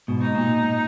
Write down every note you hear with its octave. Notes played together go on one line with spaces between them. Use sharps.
G#2 B2
D#4
A#2